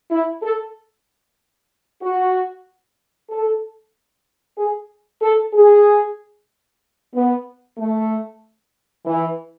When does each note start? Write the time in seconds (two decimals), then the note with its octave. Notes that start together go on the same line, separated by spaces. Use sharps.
0.11 E4
0.42 A4
2.02 F#4
3.29 A4
4.57 G#4
5.21 A4
5.53 G#4
7.13 B3
7.77 A3
9.05 E3